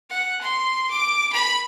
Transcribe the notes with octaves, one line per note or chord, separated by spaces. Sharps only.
F#5
C6
D6
B5